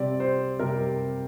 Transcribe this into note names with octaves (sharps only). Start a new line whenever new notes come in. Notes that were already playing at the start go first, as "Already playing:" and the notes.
Already playing: C3 G3 C4 D5
C5
C3 G3 C4 A#4